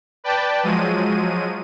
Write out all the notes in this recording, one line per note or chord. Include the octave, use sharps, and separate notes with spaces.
B4 D5 G5 A5
F3 F#3 G#3 D#7